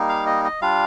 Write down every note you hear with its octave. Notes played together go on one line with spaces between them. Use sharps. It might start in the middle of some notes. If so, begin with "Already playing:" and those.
Already playing: G3 A#3 D#4
F5
D#5
D#5
G3 D4 F4 F5